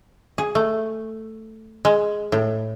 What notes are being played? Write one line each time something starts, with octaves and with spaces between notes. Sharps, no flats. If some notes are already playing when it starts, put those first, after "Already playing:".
G#4
A3
G#3
A2